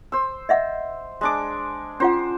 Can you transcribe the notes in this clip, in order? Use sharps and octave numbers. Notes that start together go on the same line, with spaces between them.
C5 E6
D#5 E5 F#5
G#3 D4 D6
C#4 F4 C5 F#5